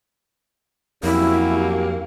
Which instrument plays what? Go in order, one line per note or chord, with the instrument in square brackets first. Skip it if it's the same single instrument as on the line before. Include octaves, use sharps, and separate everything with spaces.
[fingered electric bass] F2 [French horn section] F#3 C#4 G4 [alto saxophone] A#3 [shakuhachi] E4